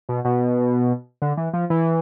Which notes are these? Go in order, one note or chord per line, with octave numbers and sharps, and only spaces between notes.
B2
B2
D3
E3
F3
E3